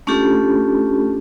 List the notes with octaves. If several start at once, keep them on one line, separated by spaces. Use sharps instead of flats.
A3 C#4 D4 F4 G4 A4